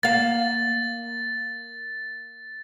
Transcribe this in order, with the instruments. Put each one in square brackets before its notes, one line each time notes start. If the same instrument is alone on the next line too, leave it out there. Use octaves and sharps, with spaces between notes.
[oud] A#3 F5 [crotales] A6